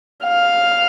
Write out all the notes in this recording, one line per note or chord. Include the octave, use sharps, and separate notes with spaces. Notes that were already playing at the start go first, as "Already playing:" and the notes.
F5